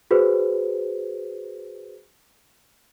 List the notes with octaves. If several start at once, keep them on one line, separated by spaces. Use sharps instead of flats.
F#4 G#4 B4 C5